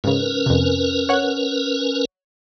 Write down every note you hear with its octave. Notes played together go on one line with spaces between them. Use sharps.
G#2 C#3 C#4 A#4 B4
F2 C3
C#5 F#5 F#6